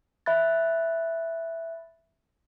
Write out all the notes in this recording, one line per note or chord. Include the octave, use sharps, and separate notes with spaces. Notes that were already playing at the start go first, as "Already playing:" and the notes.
E5 B5 F#6 A6